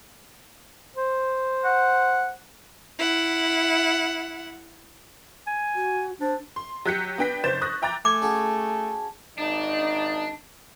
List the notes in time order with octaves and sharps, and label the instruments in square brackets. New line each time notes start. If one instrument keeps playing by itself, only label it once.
[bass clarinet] C5
[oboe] F#5
[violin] E4 F#5
[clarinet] G#5
[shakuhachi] F#4
[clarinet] D4 [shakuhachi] C5
[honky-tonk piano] C6
F#3 G4 F#6 G6 B6 C#7
B3 D4 G5 A#6 B6
F#1 C5 G6 A6 E7
C#6 D#6 F#6 A#6
E5 G5 A#5 D6 A6
[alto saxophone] A3 [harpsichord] G#5 [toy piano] D6
[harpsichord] C#4 F#4 G#4 [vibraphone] A5
[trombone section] G#1 D#4 [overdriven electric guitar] D4